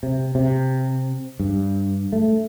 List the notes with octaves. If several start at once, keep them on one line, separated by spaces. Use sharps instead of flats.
C3
C3
G2
A3